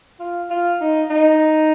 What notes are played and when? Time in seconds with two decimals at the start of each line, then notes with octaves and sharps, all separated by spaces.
0.19 F4
0.50 F4
0.81 D#4
1.10 D#4